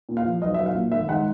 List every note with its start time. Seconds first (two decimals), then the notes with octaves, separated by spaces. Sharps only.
0.09 A#2
0.17 F5
0.25 F3
0.42 B1 D#5
0.54 B1 E5
0.66 F5
0.74 A#2
0.92 G#1 E5
1.08 G#2 F#5